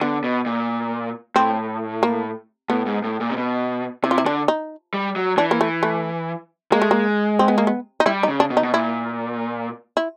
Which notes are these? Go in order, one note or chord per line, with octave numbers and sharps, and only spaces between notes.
D3 B3
B2
A#2
A2 C4
A#3
A2 B3
G#2
A2
A#2
C3
B2
C3 E4
F4
E4
D3 D4
D#4
G3
F#3
E3 D4
A#3
A3
A3
G#3 A#3
A3
A#3
C4
B3
A#3
B3
D#4
G3 E4
D#4
C#3
D4
B2
D#4
B2
A#2 E4
E4